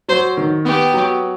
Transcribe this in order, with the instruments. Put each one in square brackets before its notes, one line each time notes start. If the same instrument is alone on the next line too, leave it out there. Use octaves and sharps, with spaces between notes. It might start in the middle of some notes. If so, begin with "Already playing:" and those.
[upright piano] F#3 [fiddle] C5
[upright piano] D#3
[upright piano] B3 [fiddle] G4
[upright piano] F#3